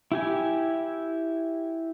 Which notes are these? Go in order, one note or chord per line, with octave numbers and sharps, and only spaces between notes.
E4 G4 G#5